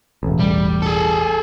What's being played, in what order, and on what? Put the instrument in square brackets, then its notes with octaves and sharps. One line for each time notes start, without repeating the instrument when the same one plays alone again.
[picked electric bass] E1 A1
[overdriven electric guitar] G3
G#4 A4